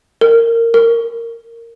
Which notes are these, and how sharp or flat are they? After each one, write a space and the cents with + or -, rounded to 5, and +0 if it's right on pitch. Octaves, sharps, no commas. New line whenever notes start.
A#4 -20
A#4 -10